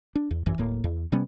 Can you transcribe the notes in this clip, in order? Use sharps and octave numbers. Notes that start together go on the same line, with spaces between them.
D4
E2
A1 F#2 E3
D1 A2 A#3
E2
C3 G3 B3 C#4